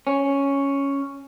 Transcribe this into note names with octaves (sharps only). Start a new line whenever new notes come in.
C#4